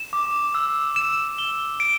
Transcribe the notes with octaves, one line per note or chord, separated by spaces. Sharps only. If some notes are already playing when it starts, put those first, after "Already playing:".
Already playing: E7
D6
E6
E7
G7
D7